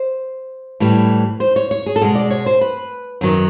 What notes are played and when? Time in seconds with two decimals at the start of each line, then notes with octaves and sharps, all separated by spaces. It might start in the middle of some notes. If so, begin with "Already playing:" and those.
Already playing: C5
0.80 A2 E3 G3
1.40 C5
1.56 C#5
1.71 C#5
1.86 G#4
1.96 A4
2.01 B2 G#3 G#4
2.15 D5
2.30 C#5
2.46 C5
2.61 B4
3.21 F#2 D#3 F#3